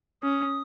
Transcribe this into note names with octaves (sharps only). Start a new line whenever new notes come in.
C#4 D#6